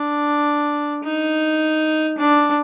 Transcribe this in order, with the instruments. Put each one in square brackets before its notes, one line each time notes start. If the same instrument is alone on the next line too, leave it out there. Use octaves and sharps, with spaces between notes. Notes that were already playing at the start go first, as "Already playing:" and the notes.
Already playing: [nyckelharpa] D4
D#4
D4